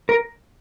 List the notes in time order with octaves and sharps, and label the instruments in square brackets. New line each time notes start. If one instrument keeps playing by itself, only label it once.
[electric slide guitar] A#4